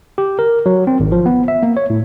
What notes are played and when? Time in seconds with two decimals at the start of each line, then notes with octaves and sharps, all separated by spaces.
0.18 G4
0.39 A#4
0.66 F#3
0.87 C4
1.00 G#1
1.12 F3
1.26 B3
1.48 E5
1.63 A#3
1.77 C#5
1.90 A2